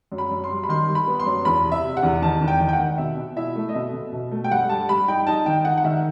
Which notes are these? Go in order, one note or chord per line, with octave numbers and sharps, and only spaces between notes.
F#2
B5
F#2
C6
G3
B5
D#3 C6
G3
B5
B3
C6
F#2
E2 B5
C3
E5
C3
F#5
E2
D#3 A5
E2
G5
D#3
G5
F#5
D#3
B2 E5
B2
E4 E5
A3
D#5
B2 E5
B2
B2
A3
G5
G2 F#5
G2 A5
G2 B5
D#4 G5
D#4 A5
D#3 G5
D#4 F#5
F#5
D#3 E5